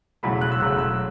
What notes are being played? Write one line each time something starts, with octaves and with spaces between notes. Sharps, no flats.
E1 E2 C#3 F#3 A3 B5
F#6
E6
E1 E2 C#3 F#3 A3 F#6
E6